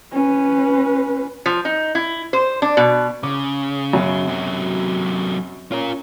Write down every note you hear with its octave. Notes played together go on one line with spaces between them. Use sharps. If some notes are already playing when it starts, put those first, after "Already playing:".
C#4 B4
F3
D#4
E4
C5
D4
B2
C#3 D6
F#2 B2
C3 F#3
C#4 F4 A#4